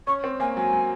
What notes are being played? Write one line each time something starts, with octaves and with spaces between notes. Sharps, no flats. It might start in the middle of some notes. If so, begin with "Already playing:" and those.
C#4 C#6
C4
A#3 G#5
F#3 G#5
F#3